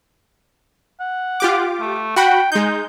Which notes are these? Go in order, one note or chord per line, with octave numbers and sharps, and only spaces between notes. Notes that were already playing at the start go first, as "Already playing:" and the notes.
F#5
F4 G4 D6
A3
F#4 F#5 G5 B5
G#3 D#4 G6